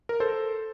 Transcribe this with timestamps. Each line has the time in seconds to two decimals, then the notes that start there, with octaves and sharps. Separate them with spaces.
0.09 A#4
0.20 A4 C5